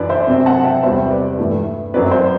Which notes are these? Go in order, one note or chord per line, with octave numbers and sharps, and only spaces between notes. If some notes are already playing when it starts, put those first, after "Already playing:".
Already playing: F#2 E3 D4 B4 D5
C5 E5
C3 F#3 C4
F#5 A5
E5 G5
E2 C3 G3 C5 E5
B4 D5
G2 E3 A3
F#2 F#3 C4 B4 D5
C5